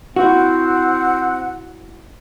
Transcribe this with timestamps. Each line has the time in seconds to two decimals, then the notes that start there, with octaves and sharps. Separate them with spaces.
0.16 C4 E4 F#4 F#5